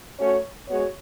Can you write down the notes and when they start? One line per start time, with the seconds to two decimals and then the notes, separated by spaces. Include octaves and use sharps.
0.19 A3 C#4 F#4 C#5
0.68 G#3 B3 F#4 C#5